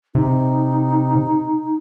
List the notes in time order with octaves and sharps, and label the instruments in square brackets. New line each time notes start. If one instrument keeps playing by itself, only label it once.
[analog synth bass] C3 [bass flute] D#4